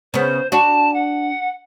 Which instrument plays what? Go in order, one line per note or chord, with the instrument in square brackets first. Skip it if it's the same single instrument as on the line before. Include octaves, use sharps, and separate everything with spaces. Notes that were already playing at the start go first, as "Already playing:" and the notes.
[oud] C#3 B3 [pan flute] C5
[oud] D4 F#4 [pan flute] A5
[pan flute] F#5